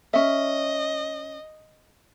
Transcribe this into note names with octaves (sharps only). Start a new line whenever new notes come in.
C#4 D#5 E5